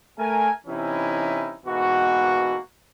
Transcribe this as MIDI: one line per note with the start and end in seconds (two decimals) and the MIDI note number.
0.19 0.50 57
0.19 0.50 70
0.19 0.50 80
0.67 1.55 48
0.67 1.55 52
0.67 1.55 61
0.67 1.55 63
0.67 1.55 64
1.66 2.57 44
1.66 2.57 47
1.66 2.57 52
1.66 2.57 58
1.66 2.57 66